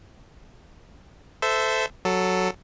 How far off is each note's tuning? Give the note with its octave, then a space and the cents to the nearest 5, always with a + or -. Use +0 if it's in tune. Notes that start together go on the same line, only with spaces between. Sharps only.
A4 +0 C5 -20 E5 +0
F#3 +0 A4 +0